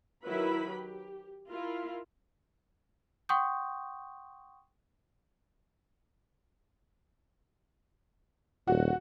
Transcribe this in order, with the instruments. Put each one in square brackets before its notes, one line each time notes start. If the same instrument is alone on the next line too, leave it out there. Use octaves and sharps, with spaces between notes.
[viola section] D#3 F#3 E4 A#4 B4 B5
G4
E4 F4 A#4
[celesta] F#5 G5 C6 C#6 D#6 G6
[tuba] D#1 [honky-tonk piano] F#4